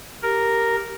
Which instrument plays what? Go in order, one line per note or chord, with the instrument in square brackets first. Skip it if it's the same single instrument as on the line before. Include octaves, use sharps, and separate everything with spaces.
[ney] G4 [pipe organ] A#4